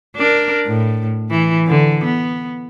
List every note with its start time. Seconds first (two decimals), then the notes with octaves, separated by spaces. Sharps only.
0.16 D4 A#4
0.66 A2
1.30 E3
1.68 D3
2.04 B3